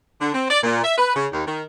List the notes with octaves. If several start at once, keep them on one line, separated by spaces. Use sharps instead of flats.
D3
C4
D5
A#2
E5
B4
C#3
D#2
D#3